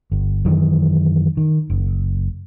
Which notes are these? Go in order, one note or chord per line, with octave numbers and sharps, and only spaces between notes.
G1
F#2 D#3 E3
D#3
F#1